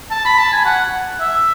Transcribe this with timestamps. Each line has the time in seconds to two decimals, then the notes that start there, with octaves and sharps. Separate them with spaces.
0.11 A5
0.25 B5
0.38 A5
0.52 G#5
0.65 F#5
1.20 E5